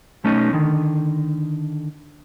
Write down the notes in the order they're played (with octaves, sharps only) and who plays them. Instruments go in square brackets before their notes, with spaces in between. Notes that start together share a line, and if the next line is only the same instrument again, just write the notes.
[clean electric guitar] B1 A3 C#4 D#4
D3 D#3